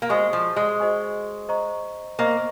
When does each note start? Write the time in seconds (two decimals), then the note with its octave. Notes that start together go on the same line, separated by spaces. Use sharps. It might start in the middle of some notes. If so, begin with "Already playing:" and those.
0.02 A#3
0.09 G#3 F#4 C5 D#5 G#5 C#6
0.33 F3
0.56 G#3
0.79 F#4 C5 D#5 G#5 C#6
1.49 C5 D#5 A#5 C#6
2.19 A#3 C5 D#5 A#5 C#6